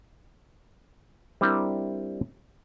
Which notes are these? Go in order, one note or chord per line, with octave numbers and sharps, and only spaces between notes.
G3 C4 D4 E4 A#4